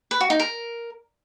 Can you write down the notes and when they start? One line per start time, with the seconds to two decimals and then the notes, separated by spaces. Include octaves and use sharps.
0.11 B4
0.21 F#4
0.30 D#4
0.40 A#4